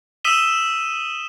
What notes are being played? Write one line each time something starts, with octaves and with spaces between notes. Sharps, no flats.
D#6 E6 B6 D#7 E7 G7